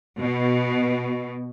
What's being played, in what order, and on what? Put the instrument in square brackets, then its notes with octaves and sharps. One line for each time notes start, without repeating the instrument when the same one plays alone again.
[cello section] B2